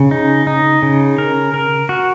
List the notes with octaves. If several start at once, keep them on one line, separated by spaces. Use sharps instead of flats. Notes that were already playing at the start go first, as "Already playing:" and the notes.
Already playing: C#3
D#4
D#4
C#3
A#4
A#4
F#4